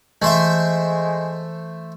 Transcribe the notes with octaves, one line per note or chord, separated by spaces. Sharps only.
E3 G#3 A3 C5 E5